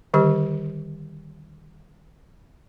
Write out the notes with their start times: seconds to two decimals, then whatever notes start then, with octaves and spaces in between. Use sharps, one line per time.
0.14 D3 D#3 G3 G4